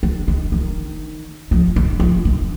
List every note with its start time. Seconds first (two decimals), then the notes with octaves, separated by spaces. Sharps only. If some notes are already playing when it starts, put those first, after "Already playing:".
0.03 D#3
0.28 D#3
0.52 D#3
1.51 F3
1.76 D#3
2.00 F3
2.25 D#3